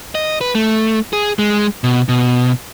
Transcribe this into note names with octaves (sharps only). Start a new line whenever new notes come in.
D#5
B4
A3
G#4
G#3
B2
B2